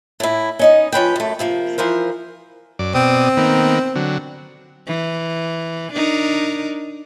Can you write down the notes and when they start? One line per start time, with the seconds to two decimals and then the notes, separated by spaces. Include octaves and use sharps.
0.20 A2 E4
0.59 C#4 D#4 D#5
0.92 F3 C#4 B4 G5
1.16 F#2 A3
1.39 C3 F3 A#3
1.78 E3 F3 A#4 C5
2.79 F#2 D5
2.94 B2 C4 D5 D#6
3.37 D#3 A#3 B3
3.95 D3 F#3
4.87 E3
5.93 D4 D#4 A#4